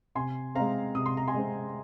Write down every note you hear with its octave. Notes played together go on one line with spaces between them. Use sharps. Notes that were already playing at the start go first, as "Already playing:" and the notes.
C3 G#5 C6
G#3 C4 F5 A#5
C3 D#6
C6
A#5
G#5 C6
G#3 C4